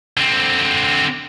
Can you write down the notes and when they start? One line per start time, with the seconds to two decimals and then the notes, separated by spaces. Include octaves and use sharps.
0.17 D3 C4